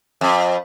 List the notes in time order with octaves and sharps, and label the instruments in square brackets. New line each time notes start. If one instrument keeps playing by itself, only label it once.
[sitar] F2